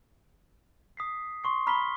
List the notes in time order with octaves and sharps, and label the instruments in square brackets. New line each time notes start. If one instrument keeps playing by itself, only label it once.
[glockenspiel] D#6 B6 C7
C6 C#6 C7
[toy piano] A#5 B5 D6 [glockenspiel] F6 B6 G7